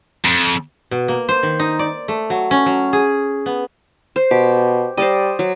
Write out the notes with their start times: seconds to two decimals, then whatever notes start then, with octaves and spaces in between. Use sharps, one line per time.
0.25 F2
0.91 B2
1.08 A#3
1.29 C5
1.43 D#3
1.59 D#4
1.79 D5
2.08 A3
2.30 F#3
2.51 C#4
2.66 F#3
2.93 G#4
3.46 B3
4.16 C5
4.31 B2 G4
4.97 G3 C5 D5 D#5
5.39 F#3